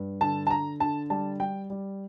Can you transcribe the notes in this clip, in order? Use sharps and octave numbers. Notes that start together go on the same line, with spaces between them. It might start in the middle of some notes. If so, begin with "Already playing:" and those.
Already playing: G2
D3 A5
A5
D3 A#5
D3 A5
G3 A5
G3 G5
G3